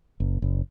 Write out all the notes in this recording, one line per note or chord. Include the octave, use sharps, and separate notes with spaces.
F#1
F#1